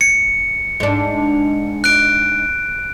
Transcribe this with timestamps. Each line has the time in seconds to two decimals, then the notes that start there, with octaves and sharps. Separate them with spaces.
0.01 C#7
0.80 G#2 D4
1.84 F#6 D7